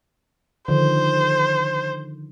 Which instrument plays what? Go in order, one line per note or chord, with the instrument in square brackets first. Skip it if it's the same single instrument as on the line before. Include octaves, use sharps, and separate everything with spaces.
[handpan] D3 D#3 F3 [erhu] C5